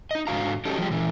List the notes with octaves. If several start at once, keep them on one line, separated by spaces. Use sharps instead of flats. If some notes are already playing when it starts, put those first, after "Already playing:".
D#4 D#5
G#2 D3 F#4 F5 A#5
C#4 D#4 F#4 G4 A4
F3 G3 G#3 G4
A#2 E3